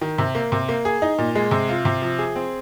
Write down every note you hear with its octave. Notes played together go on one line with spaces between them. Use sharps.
D#3
C3
A#3
C3
A#3
G#4
D#4
A#2
G#3
C3
F4
C3
F3
G#4
C4